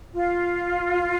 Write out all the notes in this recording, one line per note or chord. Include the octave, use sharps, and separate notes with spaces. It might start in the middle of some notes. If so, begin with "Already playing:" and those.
F4